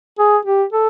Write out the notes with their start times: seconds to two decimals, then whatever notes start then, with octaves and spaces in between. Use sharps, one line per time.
0.19 G#4
0.46 G4
0.73 A4